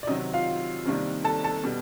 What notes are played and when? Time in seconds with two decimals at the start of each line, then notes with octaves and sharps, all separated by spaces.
0.03 D5
0.07 C3 D#3 F#3 D#4 D#5
0.33 F4 F5
0.85 C3 D#3 G3 A#3 D4
1.24 A4 A5
1.44 A4 A5
1.64 B2 G3